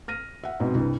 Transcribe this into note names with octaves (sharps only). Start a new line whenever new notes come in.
F6 A#6 D#7
E5 F#5
G#2 B2 C4
C2 G2